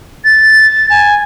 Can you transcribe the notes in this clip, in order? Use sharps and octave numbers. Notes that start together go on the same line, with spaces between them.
A6
G#5